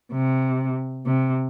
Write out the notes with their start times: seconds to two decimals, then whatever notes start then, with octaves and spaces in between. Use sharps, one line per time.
0.12 C3
1.06 C3